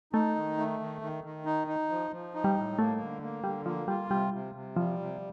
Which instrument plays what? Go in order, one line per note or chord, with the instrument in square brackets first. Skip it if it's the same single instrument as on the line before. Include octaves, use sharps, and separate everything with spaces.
[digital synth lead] A3 [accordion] D#4
[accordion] D#3
A3
D#3
D#3
D#3
D#4
D#4
F3
F3
D#4
[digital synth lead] G3
[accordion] A2
[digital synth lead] A3 [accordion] A#3
[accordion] D3
A#3
[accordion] D3 [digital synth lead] G3
[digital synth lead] F3 [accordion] A#3
[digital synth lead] G3 [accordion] F4
[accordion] C3 [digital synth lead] G3
[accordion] C3
C3
[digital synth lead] F3 [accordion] G3
[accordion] C3